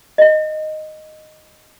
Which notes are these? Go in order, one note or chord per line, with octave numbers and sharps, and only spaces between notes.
D#5 E5